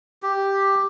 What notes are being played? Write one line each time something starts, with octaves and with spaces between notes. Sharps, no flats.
G4